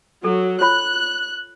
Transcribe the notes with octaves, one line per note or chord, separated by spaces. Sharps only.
F#3 A4
F4 C#5 B5 F#6